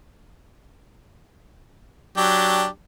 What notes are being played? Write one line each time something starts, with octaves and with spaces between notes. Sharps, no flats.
F#3 D4 G4